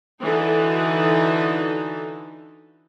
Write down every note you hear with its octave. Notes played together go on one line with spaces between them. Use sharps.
D3 E3 D#4 F#4 A4